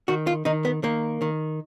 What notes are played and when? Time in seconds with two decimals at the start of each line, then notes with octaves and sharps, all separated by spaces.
0.08 D#3 F#4
0.27 F4
0.45 D#3 D#4
0.65 B3
0.83 D#3 A#3
1.22 D#3